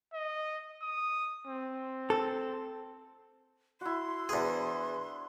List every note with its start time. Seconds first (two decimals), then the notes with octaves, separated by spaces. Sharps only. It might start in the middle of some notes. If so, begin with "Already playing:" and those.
0.13 D#5
0.82 D#6
1.47 C4
2.10 A4
3.81 E4 F#4 C6
4.29 E2 D4 G#4 C5 G#5